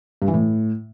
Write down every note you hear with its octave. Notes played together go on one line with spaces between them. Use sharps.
G2
E3
A2